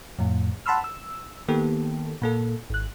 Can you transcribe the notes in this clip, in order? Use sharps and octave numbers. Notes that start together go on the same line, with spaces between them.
F2 A2
F#5 A5 B5 C6 E6 F6
E6
D#3 A#3 B3 G4 A4
A#2 A#3 A4
G#1 F#6